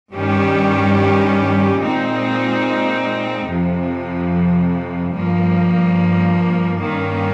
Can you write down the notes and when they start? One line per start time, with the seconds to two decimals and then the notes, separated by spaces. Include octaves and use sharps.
0.13 G2 D#3 G3 C#4 G4
1.81 A#2 G#3 C4 D#4
3.48 F2 C3 F3
5.13 G2 F3 A#3
6.81 G2 D#3 A#3 C#4